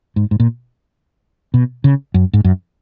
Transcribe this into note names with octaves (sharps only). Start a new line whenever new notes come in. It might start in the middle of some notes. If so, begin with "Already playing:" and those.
G#2
G#2
A#2
B2
C#3
F#2
G#2
F#2